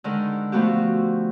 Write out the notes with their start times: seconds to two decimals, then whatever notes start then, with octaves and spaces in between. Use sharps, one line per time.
0.04 D3 D#3 G#3
0.52 F3 A3 B3 F#4 G4